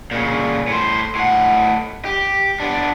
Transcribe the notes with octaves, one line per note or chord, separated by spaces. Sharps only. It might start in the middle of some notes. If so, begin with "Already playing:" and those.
A#2 C#3
A2 C5
A2 F#5
G4
B3 D4